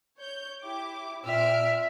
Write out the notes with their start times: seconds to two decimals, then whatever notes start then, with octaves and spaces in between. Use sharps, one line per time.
0.19 C#5 G6
0.64 E4 G4 D6
1.25 A#2 C4 E5 F6 D7